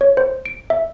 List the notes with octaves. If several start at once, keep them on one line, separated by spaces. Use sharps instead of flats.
C#5
C5
D7
E5